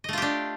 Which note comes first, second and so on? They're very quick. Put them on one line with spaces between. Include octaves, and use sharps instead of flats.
D#5 A3 F4 G4 D4